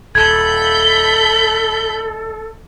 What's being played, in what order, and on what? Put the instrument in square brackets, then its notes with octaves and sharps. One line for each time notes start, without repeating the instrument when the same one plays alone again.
[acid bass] D#1 [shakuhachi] A4 [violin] B5 G6 [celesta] G#6